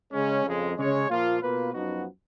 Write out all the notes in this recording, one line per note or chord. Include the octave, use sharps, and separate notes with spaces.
C#3 G#3 C#4
F2 C#3 G#3
C#3 G#3 C#4 G#4 C#5
A#2 F3 A#3 F4
B2 A#3 F4 B4
F#2 F3 B3 D#4 F#4